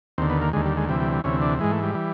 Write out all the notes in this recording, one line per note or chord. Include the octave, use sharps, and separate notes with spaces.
D#2 D3 C4
B3
A#3
D#2 D3 G#3
G3
G#3
D2 C3 E3 G3
G3
G3
D2 C3 E3 C#4
D4
G#2 E3 G#3
A3
G3
E3